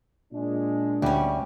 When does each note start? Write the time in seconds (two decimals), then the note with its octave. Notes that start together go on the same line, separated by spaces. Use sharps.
0.33 A#2 G#3 D4
1.02 D2 G3 C#4